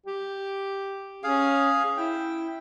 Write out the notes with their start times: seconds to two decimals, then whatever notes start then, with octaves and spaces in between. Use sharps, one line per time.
0.06 G4
1.24 C#4 G#4 F5
1.97 E4 G5